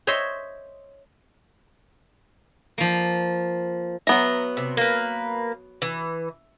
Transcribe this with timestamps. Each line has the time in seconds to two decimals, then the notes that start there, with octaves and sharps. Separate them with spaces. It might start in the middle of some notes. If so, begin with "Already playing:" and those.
0.07 C5 C#5 D#5 E5 C6
2.78 F3 A#3
4.07 F#3 B3 E5 A#5
4.57 C3
4.77 A#3 B4
5.82 E3